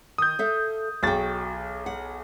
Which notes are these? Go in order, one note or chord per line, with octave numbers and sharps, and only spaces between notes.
D#3 D#6 G6
A4 E5 F5
B1 F#4 G#4 G5 A6
F#5